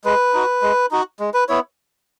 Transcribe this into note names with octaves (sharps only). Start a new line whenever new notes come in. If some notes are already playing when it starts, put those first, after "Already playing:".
G#3 B4
D#4 F#4
G#3
D#4 F#4
G#3
B4
B3 E4 C#5